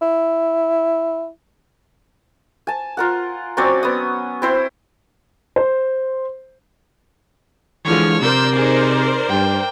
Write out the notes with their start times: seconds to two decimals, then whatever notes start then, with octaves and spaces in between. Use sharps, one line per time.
0.01 E4
2.67 G#5 A5
2.97 F4 A#4 F#5
3.57 F#3 C4 C#4 D5
3.83 B3 D#6
4.42 C4 E4 C5
5.56 C5
7.85 D3 E3 F3 G#3 C#5 F6
8.21 C3 A#4 C5 D5 E6 G6
8.56 D#4 G#4
9.29 G2 G5